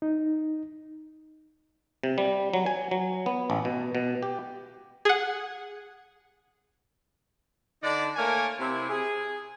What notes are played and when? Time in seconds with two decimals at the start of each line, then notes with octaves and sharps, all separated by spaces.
0.02 D#4
2.03 C3
2.18 G3
2.53 F#3
2.66 G#5
2.91 F#3
3.26 B3
3.50 A1
3.65 B2
3.95 B2
4.23 G4
5.05 G#4 F#5
7.83 D3 D4 D#4 D5
8.16 A3 A#3 A#4 C#5 G#5
8.59 C3 E4
8.90 G#4